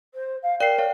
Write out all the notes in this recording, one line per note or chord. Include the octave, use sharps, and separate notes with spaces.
C5
F5
A#4 D5 G5 C7
C#5 F5